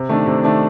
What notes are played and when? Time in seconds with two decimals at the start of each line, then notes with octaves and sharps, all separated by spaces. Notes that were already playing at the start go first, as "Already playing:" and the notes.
Already playing: C3
0.09 D#3 A3 D4
0.26 C3
0.43 D#3 A3 D4